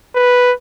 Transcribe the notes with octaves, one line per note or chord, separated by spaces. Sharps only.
B4